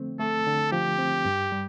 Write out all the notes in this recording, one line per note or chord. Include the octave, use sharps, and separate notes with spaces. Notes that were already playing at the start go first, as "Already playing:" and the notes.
Already playing: D3 F3 A3 C4
A3 A4
D3
F3 G4
C4
G2
G3